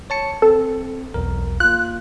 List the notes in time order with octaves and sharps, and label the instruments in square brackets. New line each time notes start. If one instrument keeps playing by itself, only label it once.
[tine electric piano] C#5 A5 C#7
[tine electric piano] C4 [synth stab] A4
[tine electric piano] B1 E2 A#4
[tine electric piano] A#3 F4 [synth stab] F#6